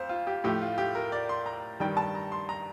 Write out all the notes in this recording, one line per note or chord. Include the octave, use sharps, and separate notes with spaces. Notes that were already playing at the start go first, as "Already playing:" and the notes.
Already playing: F2 C5 F5
F4
G4
A2 F3 A3 G4
F4
G4
A#4
D5
C6
A#5
G2 D#3 G3 G5
A5
A#5
C6
A#5